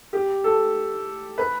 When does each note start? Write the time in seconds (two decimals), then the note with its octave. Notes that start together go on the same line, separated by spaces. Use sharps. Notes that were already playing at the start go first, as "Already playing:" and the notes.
0.13 G4
0.44 A4
1.38 B4